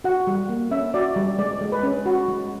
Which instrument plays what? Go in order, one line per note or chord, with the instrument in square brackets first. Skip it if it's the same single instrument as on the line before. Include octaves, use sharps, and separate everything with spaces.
[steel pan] F#4 F#5
G3
A#3
C#4 E5
F#4 D5
G3
G#3 D5
G#3
B4
C#4
F#4
G#3